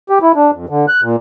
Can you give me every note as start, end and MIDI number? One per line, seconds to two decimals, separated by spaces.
0.10 0.19 67
0.22 0.32 64
0.36 0.51 62
0.53 0.65 41
0.69 0.86 50
0.88 1.01 90
1.03 1.16 46